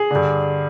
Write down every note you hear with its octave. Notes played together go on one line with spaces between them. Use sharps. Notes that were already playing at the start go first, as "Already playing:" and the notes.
Already playing: G#4
G2 D3